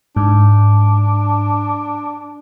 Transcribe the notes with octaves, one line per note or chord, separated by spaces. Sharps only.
G#2 D4